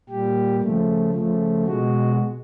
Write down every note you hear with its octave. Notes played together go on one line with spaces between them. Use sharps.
A#2 G3 G4
C#3 F3 A3
C#3 F3 A3
B2 G#3 F#4